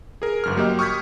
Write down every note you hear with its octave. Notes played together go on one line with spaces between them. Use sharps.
G#4 A#4
G1 F#2 F6
F#3 A#3 G4 D#5
C#6 D#6 F6 G6 G#6 B6